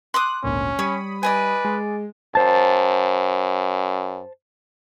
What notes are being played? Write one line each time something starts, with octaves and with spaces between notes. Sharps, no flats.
C6 D6 D#6 F#6
G#1 D2 A#2 C#4
G3 C#5 B5 D#6
B4 D5 D#5 G#5
G#3
F#2 C5 A5